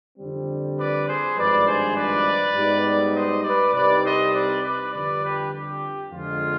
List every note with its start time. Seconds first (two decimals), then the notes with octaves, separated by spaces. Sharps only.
0.18 F2 D3 G3 C4
0.77 B4 D5
1.07 G#4 C5
1.36 G#1 G2 F3 G#3 D4 B4 D5
1.66 G#4 C5
1.95 B4 D5
2.55 G#2 G3 B3 D#4
3.14 C5 D#5
3.44 B4 D5
3.74 C2 C3 G3 C4 D#4 B4 D5
4.04 C5 D#5
4.33 B4 D5
4.63 B4 D5
4.92 F2 D3 G3 B4 D5
5.22 G4 B4
5.52 G4
6.11 F2 D3 G#3 F4